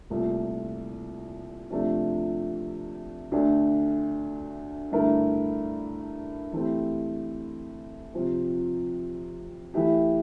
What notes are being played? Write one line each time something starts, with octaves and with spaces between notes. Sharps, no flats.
C2 A#2 A3
C3 F3 A3 D4
D2 D3 A3 D4
G2 D3 A3 E4 A#4
E3 A3 C4 G4
C3 F3 C4
E3 A3 E4 G4